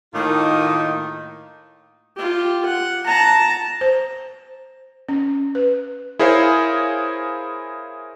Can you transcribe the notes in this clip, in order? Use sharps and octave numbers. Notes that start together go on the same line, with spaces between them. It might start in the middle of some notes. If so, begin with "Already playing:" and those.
A2 D#3 A#3 D#4 F4
F4 G4
F#5
A5 A#5
C5
C#4
B4
E4 G#4 A#4 C5 C#5 F5